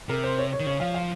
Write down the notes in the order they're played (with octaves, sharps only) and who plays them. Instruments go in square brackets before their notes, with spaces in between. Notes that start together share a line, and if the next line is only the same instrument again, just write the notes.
[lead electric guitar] C3 [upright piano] A#4
[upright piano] C5
C#5
C#5
[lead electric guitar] D#3
[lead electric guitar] C#3 [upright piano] C#5
[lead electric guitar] F3 [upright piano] F5
[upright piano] F5